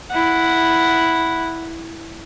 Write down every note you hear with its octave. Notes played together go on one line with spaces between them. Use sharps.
E4 F#5